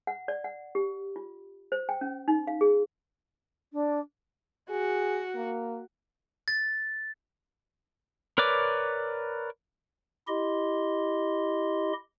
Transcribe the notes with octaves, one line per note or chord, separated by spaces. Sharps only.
F#5
D5
F#5
G4
F4
C5
G5
C#4
D#4
F5
G#4
D4
F#4 G#4
A#3
A6
A#4 B4 C#5 D5 D6
E4 G4 D#5 C6